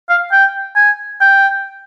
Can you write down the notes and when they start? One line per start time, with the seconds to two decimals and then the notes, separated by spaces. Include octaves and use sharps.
0.10 F5
0.32 G5
0.76 G#5
1.21 G5